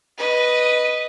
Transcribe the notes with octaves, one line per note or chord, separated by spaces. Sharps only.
B4 D#5